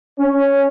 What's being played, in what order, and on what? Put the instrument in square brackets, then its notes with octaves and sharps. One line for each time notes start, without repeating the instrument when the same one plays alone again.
[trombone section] C#4